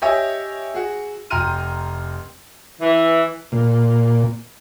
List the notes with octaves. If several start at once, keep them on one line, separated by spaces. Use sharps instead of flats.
G4 C#5 D#5 E5 G#5
F#4 G#4
F1 G5 A#5 C6 F6 D#7
E3
A#2